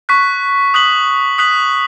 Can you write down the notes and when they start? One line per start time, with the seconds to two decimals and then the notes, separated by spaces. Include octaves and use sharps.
0.09 C#6 F#6 B6
0.74 D#6 F#6 B6 F#7
1.38 D#6 F#6 B6 F#7